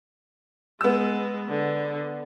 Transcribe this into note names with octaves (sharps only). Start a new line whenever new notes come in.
G#3 B3 E6
D3